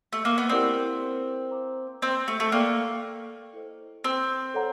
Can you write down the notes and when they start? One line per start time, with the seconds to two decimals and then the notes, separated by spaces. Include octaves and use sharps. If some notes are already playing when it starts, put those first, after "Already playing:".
0.13 A3
0.25 A#3
0.38 B3
0.49 C4 E4 G4 A#4 D5 F#5
1.51 C5 F5 A#5 D6
2.02 C4
2.28 A3
2.40 A3
2.52 A#3 A4 D5 G5
3.53 E4 A4 C5 D#5
4.04 C4
4.54 A4 C#5 F#5 A#5